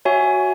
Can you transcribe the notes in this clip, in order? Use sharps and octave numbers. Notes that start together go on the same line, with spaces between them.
F#4 C#5 E5 G#5